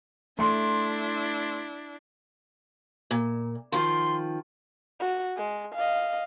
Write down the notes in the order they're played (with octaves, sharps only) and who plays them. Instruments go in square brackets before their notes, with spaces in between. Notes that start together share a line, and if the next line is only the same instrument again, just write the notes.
[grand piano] A3 C6 [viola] D4 E4
[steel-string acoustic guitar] A#2
[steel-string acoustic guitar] D#3 F3 [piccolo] C6
[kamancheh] F#4
G#3
D#5 F5